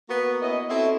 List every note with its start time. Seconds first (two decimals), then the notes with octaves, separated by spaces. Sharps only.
0.09 A#3 B3 F#4 B4
0.42 B3 C#4 E4 D#5
0.69 C4 E4 F#4 A4 E5